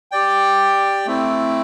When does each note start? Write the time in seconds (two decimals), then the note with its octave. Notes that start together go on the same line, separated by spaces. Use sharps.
0.12 G4 D5 G5
1.06 A3 C4 E4